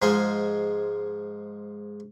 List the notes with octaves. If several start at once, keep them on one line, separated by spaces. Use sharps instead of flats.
G#2 F3 G#3 F4 C5 G#5